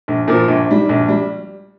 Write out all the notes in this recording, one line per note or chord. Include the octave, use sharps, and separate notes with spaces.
A#1
A#2 F3
A#1
G#2 G3
A#1
G3